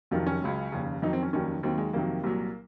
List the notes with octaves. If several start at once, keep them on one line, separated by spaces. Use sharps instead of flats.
F1 F2 C3 D#3 F#3 F4
C#4
C#2 C#3 F#3
F1 D#2 C#3
F2 D#3 F#3 D#4
C4
C#4
F1 D#2 D#3 F#3 C#4
D#2 D#3 F#3 C4
G#3
F2 C3 D#3 F#3 A#3
C2 A#2 F#3